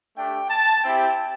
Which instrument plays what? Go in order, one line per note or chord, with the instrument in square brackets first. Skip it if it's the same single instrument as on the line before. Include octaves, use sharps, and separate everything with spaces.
[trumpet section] A3 D4 G4 G5
A5
C4 E4 G4 G5